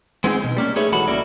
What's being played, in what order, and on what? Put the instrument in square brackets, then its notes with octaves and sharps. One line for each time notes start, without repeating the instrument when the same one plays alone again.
[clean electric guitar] G#3 B3 C4 D#4 F#4 G#4
B2
G3 A#3 C#4
A3 D#4 G#4 B4 C#5 E5
B1 E3 G#3 F#4 A4 B5
C#2 A#3 C#4 E4 F#4 D5